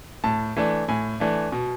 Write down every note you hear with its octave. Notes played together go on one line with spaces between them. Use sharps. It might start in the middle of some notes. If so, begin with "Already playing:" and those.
A2 A5
E3 A3 D4
A2 G#5
E3 A3 D4
B2